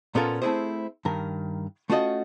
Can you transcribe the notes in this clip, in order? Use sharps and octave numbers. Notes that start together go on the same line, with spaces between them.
A#2 B3 C#4 F4 A4 A#4
A3 C4 D#4 E4 G#4 C5
G2 D#3 A#4
A3 C#4 F4 F#4 C#5 D#5